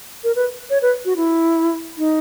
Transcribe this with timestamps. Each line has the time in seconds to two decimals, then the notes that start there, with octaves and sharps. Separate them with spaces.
0.24 A#4
0.36 B4
0.70 C#5
0.82 B4
1.05 F#4
1.17 E4
1.98 D#4